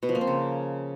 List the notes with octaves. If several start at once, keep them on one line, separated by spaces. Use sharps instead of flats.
B2
F3
A#3
C4
C#3